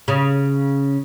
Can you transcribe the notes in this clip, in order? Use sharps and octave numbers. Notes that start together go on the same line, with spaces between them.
C#3